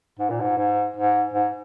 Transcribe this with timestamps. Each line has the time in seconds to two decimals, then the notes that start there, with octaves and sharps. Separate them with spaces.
0.19 G#2
0.30 A#2
0.41 G#2
0.57 G#2
0.96 G#2
1.34 G#2